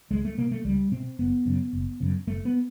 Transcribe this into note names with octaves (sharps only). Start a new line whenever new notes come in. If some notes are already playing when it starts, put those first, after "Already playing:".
C#2 G#3
A3
B2 A#3
A3
C#2 G3
B2 C4
F#1 B3
F#2 C#3
F#1
F#2 C#3
F#1 A3
B3